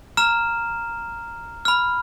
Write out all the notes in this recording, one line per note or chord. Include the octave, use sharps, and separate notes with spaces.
A#5 F6 E7
B5 F6